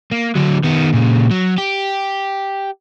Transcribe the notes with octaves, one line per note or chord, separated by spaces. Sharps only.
A#3
D3 F#3
D#3 B3
A#2 C#3
F#3
G4